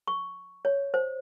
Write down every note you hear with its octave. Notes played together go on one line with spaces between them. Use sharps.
C#6
C#5
C5